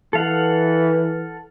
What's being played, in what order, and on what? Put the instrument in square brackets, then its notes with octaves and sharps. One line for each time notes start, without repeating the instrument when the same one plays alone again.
[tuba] E3 [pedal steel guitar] A4 F5 F#5